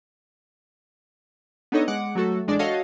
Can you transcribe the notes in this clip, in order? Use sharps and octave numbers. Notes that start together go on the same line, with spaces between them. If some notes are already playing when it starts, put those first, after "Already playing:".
B3 D4 D#4 A4 C#5 D#5
G#3 F#5 D6
F#3 A3 F#4 A4
A1 G#3 D4 D5
F#4 A4 C#5 D#5 F5